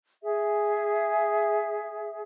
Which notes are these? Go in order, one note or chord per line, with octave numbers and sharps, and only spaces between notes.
G#4 E5